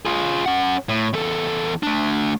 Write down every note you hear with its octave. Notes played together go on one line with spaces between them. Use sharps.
F4 G#4
C#4 F#5
A2
E2 A4
A3 D4